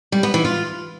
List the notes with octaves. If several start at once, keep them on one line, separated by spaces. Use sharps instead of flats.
G3
B3
E3
F4